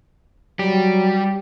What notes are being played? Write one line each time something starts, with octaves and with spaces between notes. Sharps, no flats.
F#3 G3 G4